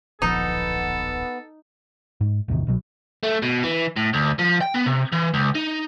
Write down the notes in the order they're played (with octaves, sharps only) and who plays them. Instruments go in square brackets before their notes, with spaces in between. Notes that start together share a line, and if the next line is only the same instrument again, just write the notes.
[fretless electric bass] D1 A#1 F3 [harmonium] B3 [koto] D#4 [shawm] A4
[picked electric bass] G#2
A1 E2 C3 D#3
C2 B2 F#3
[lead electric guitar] A3
B2
E3
A2
D2
F3
G5
B3
C3
E3
C#2
D#4